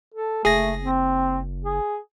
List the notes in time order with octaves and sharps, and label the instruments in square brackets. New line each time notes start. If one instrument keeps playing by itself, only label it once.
[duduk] A4
[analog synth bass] F#1 [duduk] A3 [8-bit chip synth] G#4 A#6
[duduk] C4
G#4